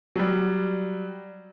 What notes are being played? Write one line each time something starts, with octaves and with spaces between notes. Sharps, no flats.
F#3 G3